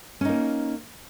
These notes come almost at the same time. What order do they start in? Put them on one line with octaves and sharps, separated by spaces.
C#4 D#4 A#3